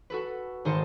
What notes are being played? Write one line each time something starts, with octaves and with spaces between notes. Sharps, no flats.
F#4 A4 B4
G#1 D#3 C5 D#5 A5 C#7